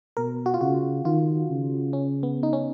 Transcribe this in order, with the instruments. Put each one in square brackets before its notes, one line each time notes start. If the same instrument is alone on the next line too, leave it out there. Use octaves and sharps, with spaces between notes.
[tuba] B2 [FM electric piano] A#4
[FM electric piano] F#4
F4
[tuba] C#3 [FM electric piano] F#4
[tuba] D#3 [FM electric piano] F4
[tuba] C#3
[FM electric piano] C#4
B3
D#4
C#4